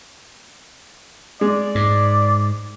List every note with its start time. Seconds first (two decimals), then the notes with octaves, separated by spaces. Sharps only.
1.41 G#3 D5
1.75 G#2